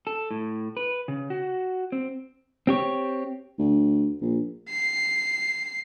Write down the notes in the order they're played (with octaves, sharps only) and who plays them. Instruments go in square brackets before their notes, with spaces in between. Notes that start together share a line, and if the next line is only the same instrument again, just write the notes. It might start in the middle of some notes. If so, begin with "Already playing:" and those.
[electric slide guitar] A4
A2
B4
C#3
F#4
C4
[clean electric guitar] C4 G4 C#5
[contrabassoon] D2
A#1
[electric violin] C7